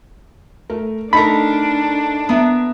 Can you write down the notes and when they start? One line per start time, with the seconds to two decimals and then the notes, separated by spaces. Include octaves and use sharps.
0.70 A3 A#4
1.13 A3 D4 D#4 A4 A#4 B5
2.29 B3 E5 A#5